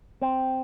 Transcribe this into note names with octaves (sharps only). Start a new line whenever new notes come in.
C4